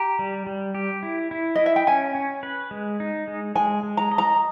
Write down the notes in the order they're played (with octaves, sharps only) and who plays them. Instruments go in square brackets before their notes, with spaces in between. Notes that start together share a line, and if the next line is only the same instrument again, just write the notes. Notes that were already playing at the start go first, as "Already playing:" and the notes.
Already playing: [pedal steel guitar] G4 [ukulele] A#5
[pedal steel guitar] G3
G3
G4
E4
E4
[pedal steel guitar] E4 [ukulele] D#5
[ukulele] E5
G5
[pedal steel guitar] C#4 [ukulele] G#5
[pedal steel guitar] C#4
B4
G#3
D#4
G#3
[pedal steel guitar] G#3 [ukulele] G#5
[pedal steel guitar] G#3
[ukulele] A#5
[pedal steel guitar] D#5
[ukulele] A#5